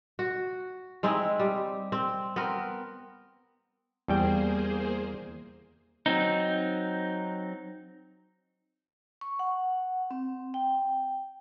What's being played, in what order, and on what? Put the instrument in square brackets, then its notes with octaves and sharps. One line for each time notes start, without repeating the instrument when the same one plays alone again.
[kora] F#4
G#3 C4 D#4 E4
G3
C4
B3 C4 A#4
[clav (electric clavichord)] E2 G3 G5 [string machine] A#3 G#4 C5
[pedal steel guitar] F#3 C4 D#4
[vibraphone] C#6
F#5
C4
G5